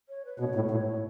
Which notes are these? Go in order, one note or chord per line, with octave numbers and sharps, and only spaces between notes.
C#5
B4
B2 C#5
A2
A2